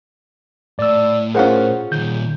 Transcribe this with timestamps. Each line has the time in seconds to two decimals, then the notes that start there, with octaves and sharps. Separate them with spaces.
0.79 A2 D5 E6
1.35 C#4 F4 G#4 A#4 C5 F#5
1.92 A#2 D#3 G6